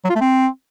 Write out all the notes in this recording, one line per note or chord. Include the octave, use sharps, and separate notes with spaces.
F#3
F4
A3
C4